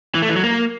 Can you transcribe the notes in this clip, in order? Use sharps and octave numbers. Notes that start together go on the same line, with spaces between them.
E3
A3
E3
F#3
A#3